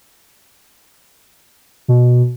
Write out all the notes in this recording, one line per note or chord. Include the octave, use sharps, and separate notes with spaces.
B2